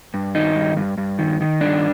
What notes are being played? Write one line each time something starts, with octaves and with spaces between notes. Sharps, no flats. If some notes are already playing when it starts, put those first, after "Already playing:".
G2
D#3 D#4
G2
G2
G2
D#3
D#3
G2 D4